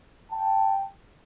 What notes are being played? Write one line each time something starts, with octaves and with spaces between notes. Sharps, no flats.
G5 A5